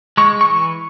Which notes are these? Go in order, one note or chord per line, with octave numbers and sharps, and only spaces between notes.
G#3 C#6
C#6
E3